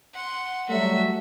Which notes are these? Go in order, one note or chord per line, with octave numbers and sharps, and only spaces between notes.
F#5 C6
F#3 G3 A3 F#4 E5